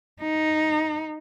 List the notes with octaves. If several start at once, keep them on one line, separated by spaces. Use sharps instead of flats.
D#4